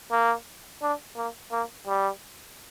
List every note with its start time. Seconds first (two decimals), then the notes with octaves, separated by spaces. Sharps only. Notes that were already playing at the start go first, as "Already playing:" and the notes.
0.11 A#3
0.82 D4
1.16 A#3
1.52 A#3
1.87 G3